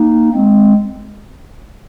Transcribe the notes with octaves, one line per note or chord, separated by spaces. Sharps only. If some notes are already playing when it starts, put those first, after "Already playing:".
Already playing: A#3 D#4
G#3 C4